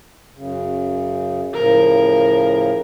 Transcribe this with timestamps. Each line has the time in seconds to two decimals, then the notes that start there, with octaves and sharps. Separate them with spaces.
0.35 F#2 C#3
1.54 A2 C#3 F3 A#4